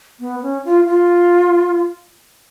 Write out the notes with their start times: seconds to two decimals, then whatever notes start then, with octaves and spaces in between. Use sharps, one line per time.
0.20 B3
0.42 C#4
0.65 F4
0.86 F4